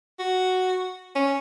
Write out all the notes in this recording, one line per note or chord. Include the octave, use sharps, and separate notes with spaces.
F#4
C#4